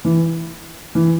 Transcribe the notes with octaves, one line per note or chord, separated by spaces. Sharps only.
E3
E3